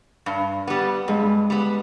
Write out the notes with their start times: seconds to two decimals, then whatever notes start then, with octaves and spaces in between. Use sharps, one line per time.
0.26 G2
0.67 G3 B3
1.08 G2 G#3
1.50 G3 B3